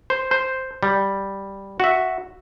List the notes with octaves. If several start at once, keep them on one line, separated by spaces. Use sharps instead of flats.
C5
C5
G3
F#4 E5